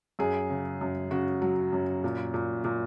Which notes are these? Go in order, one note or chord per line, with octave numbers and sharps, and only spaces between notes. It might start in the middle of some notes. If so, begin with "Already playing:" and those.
F#2 G#4
C#3
F#2
C#3 F#4
F#3
F#2
A#2
A#2
A#2